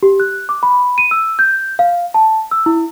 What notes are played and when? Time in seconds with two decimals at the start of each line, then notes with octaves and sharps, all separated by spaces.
0.03 G4
0.20 F#6
0.49 D6
0.63 B5
0.98 D#7
1.11 E6
1.39 G6
1.79 F5
2.14 A5
2.51 E6
2.66 E4